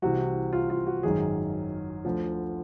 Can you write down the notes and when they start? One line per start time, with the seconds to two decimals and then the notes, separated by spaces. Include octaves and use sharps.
0.02 C2 C3 E3 F#4
0.53 F4
0.70 F4
0.87 F#4
1.03 G#1 F#2 D#3 G#4
2.05 D2 D3 F3